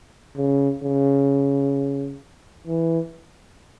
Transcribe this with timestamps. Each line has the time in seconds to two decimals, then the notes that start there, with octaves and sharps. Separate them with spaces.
0.37 C#3
0.83 C#3
2.67 E3